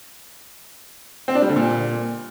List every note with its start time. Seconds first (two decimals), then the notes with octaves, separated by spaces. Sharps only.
1.28 C4
1.35 D4
1.42 G3
1.49 D3
1.56 A#2